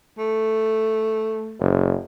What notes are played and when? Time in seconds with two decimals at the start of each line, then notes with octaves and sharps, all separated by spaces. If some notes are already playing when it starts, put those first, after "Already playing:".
0.18 A3
1.60 F#1